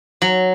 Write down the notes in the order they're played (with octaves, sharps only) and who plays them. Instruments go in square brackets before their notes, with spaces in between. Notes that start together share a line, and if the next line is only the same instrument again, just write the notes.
[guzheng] F#3